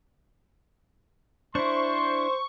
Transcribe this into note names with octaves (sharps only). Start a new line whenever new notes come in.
D4 E4 C5 C6 C#6